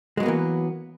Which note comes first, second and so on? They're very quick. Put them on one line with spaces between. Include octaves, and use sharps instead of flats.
G#3 F#3 B3 A#3 E3